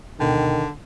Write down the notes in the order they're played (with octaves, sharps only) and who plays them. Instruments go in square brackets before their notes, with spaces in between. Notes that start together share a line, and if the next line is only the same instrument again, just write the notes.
[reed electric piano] D2 B2 G5 [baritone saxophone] D3 [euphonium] D#3